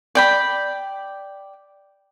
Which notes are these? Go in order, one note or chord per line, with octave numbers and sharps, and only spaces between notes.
D5 G5 B5